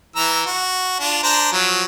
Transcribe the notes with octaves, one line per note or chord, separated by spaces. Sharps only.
E3 A#5 E6
F#4
D4 F4
D4 C5 A#5
F3 F#3